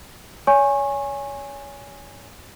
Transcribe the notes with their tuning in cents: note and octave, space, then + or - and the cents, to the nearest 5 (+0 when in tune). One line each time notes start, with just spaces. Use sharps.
C#5 +30 G#5 -5 C#6 -30